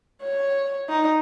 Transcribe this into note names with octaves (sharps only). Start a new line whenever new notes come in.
C#5
D#4